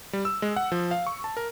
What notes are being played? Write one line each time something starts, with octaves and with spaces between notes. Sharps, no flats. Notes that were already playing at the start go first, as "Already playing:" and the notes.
G3
E6
G#3
F#5
F3
F5
C#6
A5
A#4